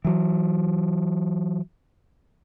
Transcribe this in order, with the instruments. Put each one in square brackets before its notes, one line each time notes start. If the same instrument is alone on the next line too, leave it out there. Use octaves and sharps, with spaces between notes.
[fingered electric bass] E3 F#3